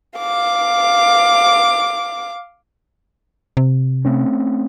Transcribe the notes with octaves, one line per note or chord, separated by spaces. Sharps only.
F5 D6
C3
A3 C4 C#4